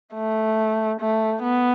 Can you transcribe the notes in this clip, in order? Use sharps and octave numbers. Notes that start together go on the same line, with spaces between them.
A3
A3
B3